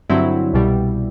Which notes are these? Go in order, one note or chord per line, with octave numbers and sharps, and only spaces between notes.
G2 D3 F#3 C4 E4
C2 B2 G3